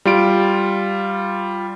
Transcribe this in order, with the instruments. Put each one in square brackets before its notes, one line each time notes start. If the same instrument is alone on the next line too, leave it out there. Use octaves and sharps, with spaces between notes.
[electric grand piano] G3 F4 D7